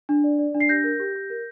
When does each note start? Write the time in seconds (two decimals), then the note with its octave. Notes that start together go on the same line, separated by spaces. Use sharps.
0.09 D4
0.24 D5
0.39 D5
0.54 D4
0.60 C7
0.69 G4 G6 A#6
0.84 A#4
1.00 G4
1.15 G4
1.30 A#4